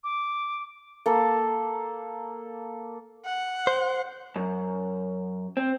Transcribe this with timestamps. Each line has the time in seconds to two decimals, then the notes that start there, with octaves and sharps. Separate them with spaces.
0.04 D6
1.06 A#3 A4
3.25 F#5
3.67 C5
4.36 F#2
5.57 C4